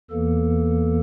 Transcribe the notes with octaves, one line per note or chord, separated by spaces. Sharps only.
E2 E3 A#3 A4